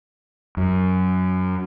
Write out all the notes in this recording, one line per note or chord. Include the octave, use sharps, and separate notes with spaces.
F#2